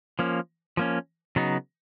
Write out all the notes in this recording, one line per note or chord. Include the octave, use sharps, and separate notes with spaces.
F3 A#3 C#4
F3 A#3 C#4
C#3 F#3 B3 D#4